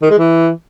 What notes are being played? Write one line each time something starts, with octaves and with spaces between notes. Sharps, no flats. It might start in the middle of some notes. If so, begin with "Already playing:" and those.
D#3
G#3
E3